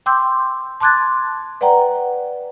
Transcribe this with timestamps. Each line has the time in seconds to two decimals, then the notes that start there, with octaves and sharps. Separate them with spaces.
0.06 G5 C6 D6 E6 G6
0.80 A5 C6 D6 F#6 G#6 A6
1.61 B4 D5 F#5 G5 A#5